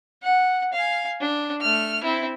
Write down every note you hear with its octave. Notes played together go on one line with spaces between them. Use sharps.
F#5
F5 G#5
D4
A3 F6
C4 E4